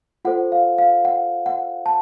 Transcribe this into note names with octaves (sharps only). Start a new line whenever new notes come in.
F4 A4 C5 F#5
F5
F5
F#5
F#5
A5